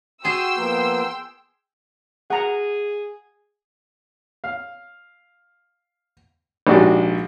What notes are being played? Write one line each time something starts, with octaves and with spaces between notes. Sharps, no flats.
F#4 G#4 G5 C6 E6
F3 A#3 B3
G#4 F#5 A#5
F5
A#1 G#2 G#3 F#4 G4 D5